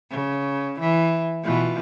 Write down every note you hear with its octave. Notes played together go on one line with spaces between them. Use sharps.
C#3
E3
B2 E3 F4